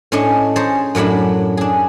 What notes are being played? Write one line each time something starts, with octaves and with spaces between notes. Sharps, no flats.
A2 C#4 D4 C#5 D#5
G#4 C5 C#5 A5 A#5
F#2 A2 F#3 D4 B5
D4 G#4